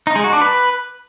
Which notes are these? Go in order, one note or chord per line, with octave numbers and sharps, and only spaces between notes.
D#4
G#3
F#4
D4
B4